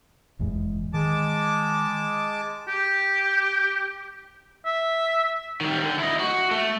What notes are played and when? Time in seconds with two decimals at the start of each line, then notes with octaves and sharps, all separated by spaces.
0.39 F1 E2 G#2
0.94 D#3 G#3 A5 D6
2.67 G4
4.65 E5
5.61 D#3 G3
5.84 D3
5.99 E4 D#5
6.19 F#4
6.51 A3